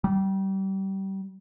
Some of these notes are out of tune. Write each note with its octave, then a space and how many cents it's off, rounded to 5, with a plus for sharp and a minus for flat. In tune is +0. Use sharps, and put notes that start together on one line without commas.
G3 -25